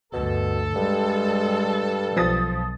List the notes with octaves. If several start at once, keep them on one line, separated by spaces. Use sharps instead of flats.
D2 G2 B2 A4
G2 G3 G#3
B1 F3 D#6 A6